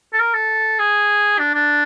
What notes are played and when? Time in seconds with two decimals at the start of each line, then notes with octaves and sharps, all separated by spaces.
0.13 A4
0.20 A#4
0.34 A4
0.79 G#4
1.39 D4
1.54 D4